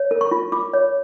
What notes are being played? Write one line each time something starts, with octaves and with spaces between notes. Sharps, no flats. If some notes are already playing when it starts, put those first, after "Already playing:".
Already playing: C#5
A#4
C#6
F4
F4 D6
C#5